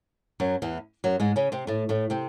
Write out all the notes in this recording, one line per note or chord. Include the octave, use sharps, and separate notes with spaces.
F#2 F#3
E2 E3
F#2 F#3
G#2 G#3
C#3 C#4
C3 C4
A2 A3
A2 A3
C3 C4